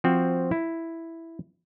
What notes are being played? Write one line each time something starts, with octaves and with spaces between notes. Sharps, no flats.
F3 C4 F#4
E4